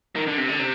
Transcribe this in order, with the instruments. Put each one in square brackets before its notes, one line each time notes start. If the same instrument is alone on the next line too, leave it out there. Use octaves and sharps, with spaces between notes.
[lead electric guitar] D#3
D3
C3
D3
C3